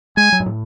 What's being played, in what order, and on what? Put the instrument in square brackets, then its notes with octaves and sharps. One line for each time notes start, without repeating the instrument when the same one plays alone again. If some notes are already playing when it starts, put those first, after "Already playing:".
[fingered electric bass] G#3 [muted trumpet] G#5
[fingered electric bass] F#3
G#2
A2